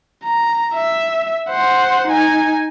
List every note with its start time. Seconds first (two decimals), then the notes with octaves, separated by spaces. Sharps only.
0.23 A#5
0.74 E5
1.50 C5 F#5
2.07 D#4 G#5